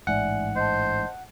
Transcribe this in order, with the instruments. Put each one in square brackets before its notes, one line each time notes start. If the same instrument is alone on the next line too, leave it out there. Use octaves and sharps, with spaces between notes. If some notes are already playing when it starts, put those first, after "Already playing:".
[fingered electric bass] A1 G#2 [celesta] D5 E5 G#5 [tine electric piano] F#5
[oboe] C5 [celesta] D#5 A5